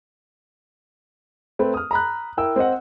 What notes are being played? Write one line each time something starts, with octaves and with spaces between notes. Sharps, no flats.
A3 C4 B4
D#6 F6
A#5 B5 F#6
E4 A#4 G5 E6
C4 C5 D#5 F#5